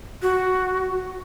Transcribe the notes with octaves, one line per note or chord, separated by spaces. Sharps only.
F#4